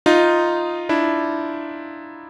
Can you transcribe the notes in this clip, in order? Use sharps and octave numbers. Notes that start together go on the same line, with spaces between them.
D#4 F4
D4 E4